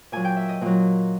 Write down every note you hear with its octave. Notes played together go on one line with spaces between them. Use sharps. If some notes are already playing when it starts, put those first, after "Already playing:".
A#2 F#3 G#5
G5
E5
D#5
A#2 F#3